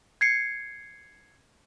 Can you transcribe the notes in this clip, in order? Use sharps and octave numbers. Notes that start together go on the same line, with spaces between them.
G#6 C7 C#7